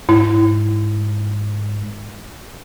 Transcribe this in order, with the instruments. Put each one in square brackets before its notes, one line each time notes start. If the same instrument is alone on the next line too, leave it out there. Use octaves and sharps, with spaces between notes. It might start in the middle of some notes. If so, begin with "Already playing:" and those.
[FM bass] G#2 [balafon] E4